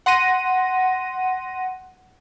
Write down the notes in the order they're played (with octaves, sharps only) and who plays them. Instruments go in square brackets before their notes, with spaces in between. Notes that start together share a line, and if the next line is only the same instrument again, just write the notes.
[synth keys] F#5 C6 A#6 D#7